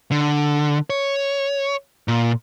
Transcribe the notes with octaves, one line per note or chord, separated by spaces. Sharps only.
D3
C#5
A#2